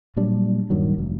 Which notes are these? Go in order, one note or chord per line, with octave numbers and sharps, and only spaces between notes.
A#2 F#3 G3 D4
D#1 G2 D#3 F#3
F1